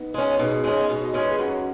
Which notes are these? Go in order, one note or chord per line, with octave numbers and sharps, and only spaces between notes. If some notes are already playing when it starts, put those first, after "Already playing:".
Already playing: B3 D#4
G#3 C#4
B2 D#4 G#4
G#3 C#4
B2
D#5
G#3 C#4 C#5
B4
G#4
F#2 C#4 F#4